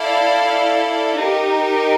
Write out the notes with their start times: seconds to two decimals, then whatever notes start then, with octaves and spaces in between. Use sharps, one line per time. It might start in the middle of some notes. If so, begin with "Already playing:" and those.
Already playing: E4 A4 D5 F5
1.16 D#4 G4 A#4